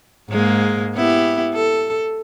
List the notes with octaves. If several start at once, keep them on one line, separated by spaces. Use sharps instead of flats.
G#2 G#3 A#3
B3 E4 G4
A4